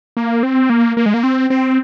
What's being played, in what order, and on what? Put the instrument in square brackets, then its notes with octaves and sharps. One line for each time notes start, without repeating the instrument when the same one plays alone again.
[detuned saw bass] A#3
C4
A#3
A#3
G#3
A#3
C4
C4